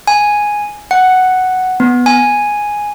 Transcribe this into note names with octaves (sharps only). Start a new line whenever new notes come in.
G#5
F#5
B3
G#5